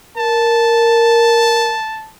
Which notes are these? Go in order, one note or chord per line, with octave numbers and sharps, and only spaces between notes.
A#4 A5